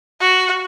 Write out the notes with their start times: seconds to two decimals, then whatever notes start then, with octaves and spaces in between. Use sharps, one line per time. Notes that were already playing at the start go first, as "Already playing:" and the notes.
0.21 F#4